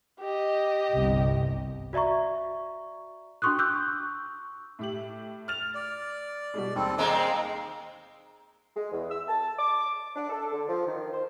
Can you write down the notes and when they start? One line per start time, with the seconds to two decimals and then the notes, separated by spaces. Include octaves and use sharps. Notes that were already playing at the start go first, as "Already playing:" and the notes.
0.20 G4 D#5
0.93 G1 C2 C3
1.93 F#4 D5 E5 A#5 C#6
3.42 D4 F#4 C6 C#6 D#6 F#6
3.59 C#6 D6 E6 F#6 G6
4.79 A2 G4 F#7
5.48 F6 A6 F7
5.75 D5
6.54 B2 G3 G#3
6.76 D#2 G3 C4 A4
6.98 G#3 A#3 C4 D#4
8.75 G#3
8.92 E2
9.10 E6
9.27 A5
9.58 D6
10.16 D4
10.30 A4
10.53 D3
10.68 F3
10.87 D#3
11.12 C5